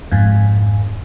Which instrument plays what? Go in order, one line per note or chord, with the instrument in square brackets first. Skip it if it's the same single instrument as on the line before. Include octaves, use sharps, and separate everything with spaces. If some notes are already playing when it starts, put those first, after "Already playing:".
[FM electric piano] F2 G#2